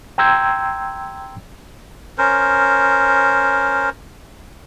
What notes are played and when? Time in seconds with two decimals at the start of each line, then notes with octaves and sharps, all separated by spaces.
0.18 G5 A#5 C6 E6 G6 G#6
2.18 C#4 A#4 C5